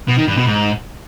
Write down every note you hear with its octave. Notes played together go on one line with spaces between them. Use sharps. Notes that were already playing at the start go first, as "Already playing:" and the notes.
B2
D#3
G2
B2
G#2